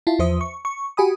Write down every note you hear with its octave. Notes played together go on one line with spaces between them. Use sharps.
E4 F4 A5
E2 F3 C5 E5 D#6
C#6
C#6
F#4 G4 G#5 B5 D#6